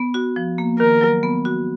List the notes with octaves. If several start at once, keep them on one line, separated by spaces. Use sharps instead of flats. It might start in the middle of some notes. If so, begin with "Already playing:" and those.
Already playing: B3
F#4
F3
A#3
D#3 A#4
F#3
B3
F#4